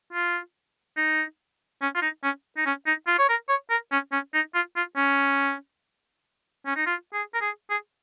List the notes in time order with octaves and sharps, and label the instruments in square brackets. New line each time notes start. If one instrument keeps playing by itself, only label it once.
[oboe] F4
D#4
C#4
F4
D#4
C#4
D#4
C#4
D#4
F4
C#5
A#4
C#5
A#4
C#4
C#4
D#4
F4
F4
C#4
C#4
D#4
F4
G#4
A#4
G#4
G#4